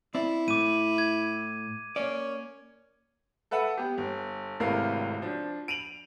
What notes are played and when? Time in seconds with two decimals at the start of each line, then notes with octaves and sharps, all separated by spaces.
0.15 C4 E4 D5
0.48 A2 D6 D#7
0.98 G#6
1.96 A#3 C#4 D5
3.51 A4 B4 E5 F#5
3.77 B3 G4
3.98 G1
4.60 G#1 A2 C3 A#4 B4 F5
5.22 F3 D4
5.68 D7 D#7 F7 F#7